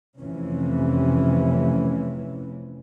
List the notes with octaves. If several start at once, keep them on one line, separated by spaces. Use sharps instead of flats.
F1 F2 C3 E3 C#4